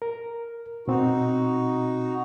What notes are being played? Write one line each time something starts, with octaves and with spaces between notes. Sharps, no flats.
A#4
B2 C4 D#4 F#4